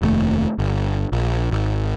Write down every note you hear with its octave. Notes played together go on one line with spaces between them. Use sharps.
F1 D#2 B2 A3
G1
A#1
G#1